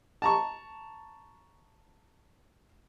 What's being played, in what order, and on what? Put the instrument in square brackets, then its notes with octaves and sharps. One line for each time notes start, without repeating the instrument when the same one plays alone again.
[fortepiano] A5 A#5 C#6